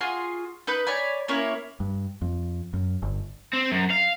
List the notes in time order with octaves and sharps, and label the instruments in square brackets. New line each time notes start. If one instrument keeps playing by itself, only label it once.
[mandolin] F4 F#4 G#4 C6
D#4 B4 B5 G6
C#5 D5 G#5 B5
A#3 C#4 E4 C#5
[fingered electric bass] G2
F2
F#2
G1
[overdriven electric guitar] C4
F#2
F5